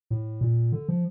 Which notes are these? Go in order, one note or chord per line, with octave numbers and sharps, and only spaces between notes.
A2
A#2
D3
F3